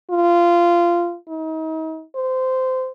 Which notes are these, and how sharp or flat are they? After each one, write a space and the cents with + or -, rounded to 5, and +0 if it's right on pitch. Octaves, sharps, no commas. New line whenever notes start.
F4 -15
D#4 +40
C5 -20